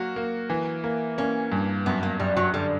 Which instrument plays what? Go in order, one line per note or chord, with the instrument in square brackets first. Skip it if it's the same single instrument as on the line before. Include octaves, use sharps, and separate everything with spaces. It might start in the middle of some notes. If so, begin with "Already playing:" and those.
Already playing: [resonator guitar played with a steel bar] F#3 [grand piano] A#3 F#4
[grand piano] A#3
E3
A#3
[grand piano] A#3 [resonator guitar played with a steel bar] C#4
[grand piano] G2
[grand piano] F#2 [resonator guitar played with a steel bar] B3
[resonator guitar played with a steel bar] A#3
[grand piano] F#2 [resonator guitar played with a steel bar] G3
[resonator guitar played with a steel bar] F#3
[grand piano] D3 [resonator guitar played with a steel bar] G3